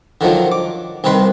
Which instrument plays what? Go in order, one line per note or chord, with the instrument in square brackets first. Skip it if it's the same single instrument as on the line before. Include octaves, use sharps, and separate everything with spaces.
[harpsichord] D3 D#3 F3 F#3
D6
C2 C3 D#3 B4 C6